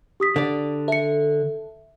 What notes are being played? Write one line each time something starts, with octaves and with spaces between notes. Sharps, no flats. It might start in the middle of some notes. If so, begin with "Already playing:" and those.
G4 D#6 B6
D3 D5
A4 E5 C#7